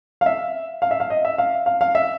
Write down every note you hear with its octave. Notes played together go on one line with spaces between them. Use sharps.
F5
E5
F5
E5
F5
D#5
E5
F5
F5
F5
E5